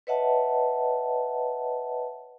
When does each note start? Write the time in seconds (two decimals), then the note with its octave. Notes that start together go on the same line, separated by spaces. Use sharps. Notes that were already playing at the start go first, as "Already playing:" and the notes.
0.07 B4 C#5 D#5 E5 F#5 A5